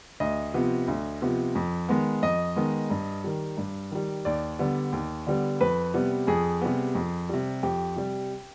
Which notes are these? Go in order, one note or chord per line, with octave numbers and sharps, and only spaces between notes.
D2 D#5
C3 F3 B3
D2
C3 F3 B3
F2
D#3 G#3 B3
F2 D#5
D#3 G#3 B3
G2
D#3 G3
G2
D#3 G3
D#2 D5
D3 G3 B3
D#2
D3 G3 B3
F2 B4
C3 G3 B3
F2 G#4
C3 G3 B3
F2
C3 G3
F2 G4
C3 G3